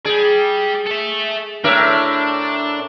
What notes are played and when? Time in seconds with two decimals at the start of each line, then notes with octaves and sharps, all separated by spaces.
0.05 G#4 D5 G5
0.86 A4 E5
1.64 A2 D4 A#4 E5